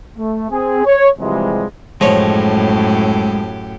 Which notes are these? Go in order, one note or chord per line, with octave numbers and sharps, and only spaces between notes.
A3
C4 G#4
C#5
C3 E3 F3 G3 G#3
F#2 A2 F3 G#3 G4 C#5